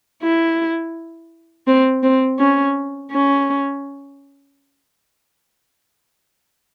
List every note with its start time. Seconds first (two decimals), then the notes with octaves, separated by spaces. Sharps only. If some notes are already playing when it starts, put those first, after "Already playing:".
0.23 E4
1.67 C4
2.03 C4
2.39 C#4
3.12 C#4